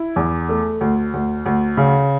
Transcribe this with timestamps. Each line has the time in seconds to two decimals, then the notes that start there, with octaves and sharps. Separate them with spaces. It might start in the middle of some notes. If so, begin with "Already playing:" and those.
Already playing: E4
0.16 E2
0.49 A3
0.81 D2
1.14 D2
1.46 D2
1.77 C#3